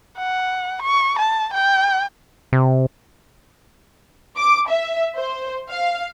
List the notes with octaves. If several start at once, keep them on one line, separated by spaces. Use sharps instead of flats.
F#5
C#6
A5
G5
C3
D6
E5
C5
F5